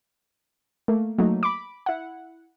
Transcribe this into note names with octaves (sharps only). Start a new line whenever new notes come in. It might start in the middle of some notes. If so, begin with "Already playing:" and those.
A3 A#3
F#3 A3 A#3 D#4
B5 D6
E4 F#5